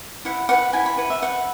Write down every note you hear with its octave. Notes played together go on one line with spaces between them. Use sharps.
E4 F#5
B4 F#5
E4 G#5
B5
B4 F#5
E5
B4 F#5